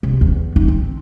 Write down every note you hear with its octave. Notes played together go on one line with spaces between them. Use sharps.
C2
E2
D#4
C4